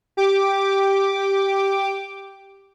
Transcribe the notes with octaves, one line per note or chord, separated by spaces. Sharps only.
G4 D6